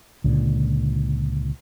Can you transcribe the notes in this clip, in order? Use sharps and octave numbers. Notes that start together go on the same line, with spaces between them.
C#2 A#2 D3